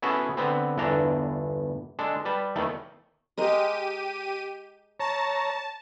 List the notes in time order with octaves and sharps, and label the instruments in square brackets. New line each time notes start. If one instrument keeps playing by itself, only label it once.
[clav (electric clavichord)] B3 C#4 E4 F#4 G#4 A4
D3 B3 C4
G1 E2 E3 D4 A4 A#5
G#3 D4 A4
G3 B4 A5
E2 D#3 A3
[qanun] G#3 A#4 D#5 [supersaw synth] G4 D#7
[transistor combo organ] C#5 A#5 [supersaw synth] A5